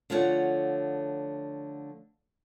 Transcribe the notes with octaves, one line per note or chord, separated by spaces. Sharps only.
D3 F3 A3 C#5 F#5